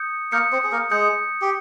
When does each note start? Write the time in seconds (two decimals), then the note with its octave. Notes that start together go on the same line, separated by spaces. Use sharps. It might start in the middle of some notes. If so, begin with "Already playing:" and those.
Already playing: D#6 G6 C#7
0.32 A#3 A#4 D#6 G6 C#7
0.52 C4 C5
0.64 G#4
0.72 A#3 A#4
0.91 G#3 G#4 D#6 G6 C#7
1.41 G4